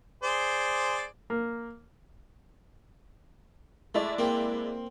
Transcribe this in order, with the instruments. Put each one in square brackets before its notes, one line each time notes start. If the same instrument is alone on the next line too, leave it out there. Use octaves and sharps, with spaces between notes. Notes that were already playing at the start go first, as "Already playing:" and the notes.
[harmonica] G#4 C5 D5
[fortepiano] A#3
[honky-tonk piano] G#3 E4 D5 [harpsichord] A3
[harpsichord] A#3 C4